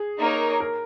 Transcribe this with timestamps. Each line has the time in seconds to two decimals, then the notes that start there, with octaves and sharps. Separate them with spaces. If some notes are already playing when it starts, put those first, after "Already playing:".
Already playing: G#4
0.20 A#3 D#4 A#4 C#5
0.60 A#4